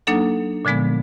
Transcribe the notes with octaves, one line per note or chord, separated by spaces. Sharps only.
F#3 A#3 D4 D#4 A4 F#5
A#2 D3 F3 G#3 B3